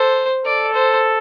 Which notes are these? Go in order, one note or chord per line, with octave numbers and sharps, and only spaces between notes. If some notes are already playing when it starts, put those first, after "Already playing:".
Already playing: A4 C5
A4 D5
C5